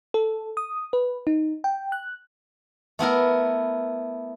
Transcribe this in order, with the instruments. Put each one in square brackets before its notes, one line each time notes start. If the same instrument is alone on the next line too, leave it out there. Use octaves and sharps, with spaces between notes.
[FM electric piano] A4
D#6
B4
D#4
G5
F#6
[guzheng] A3 B3 E4 A#4